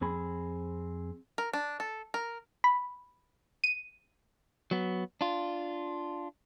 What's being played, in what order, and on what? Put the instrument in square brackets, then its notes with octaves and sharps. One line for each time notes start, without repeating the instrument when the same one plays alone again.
[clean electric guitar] F2 C4 G#4 B5
[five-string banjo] A#4
D4
A4
A#4
[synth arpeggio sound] B5
D#7
[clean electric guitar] F#3 B3
D4 F4